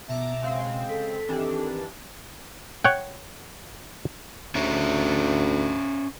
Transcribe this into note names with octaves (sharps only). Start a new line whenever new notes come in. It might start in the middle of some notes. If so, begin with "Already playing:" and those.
B2 B3 E5 A5 A#5 D6
C#3 G#3 C4 F5
A4 B6
D#3 E3 C4 D4 G4
C#5 F#5 G5
D2 C#4 C5 E5